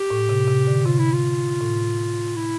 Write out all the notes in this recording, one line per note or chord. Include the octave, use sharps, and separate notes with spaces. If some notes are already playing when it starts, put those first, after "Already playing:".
Already playing: G4
A2
C3
C3
D3
C3 F4
E4
F4
A2
E4